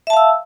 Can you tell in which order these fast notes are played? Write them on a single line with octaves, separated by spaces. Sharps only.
E5 A5 F5 E6